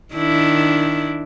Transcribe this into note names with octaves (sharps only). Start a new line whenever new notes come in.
D#3 D4 E4